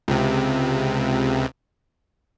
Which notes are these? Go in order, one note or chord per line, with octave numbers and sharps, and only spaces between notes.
C#2 C3